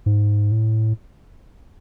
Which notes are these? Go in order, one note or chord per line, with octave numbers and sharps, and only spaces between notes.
G#2
A2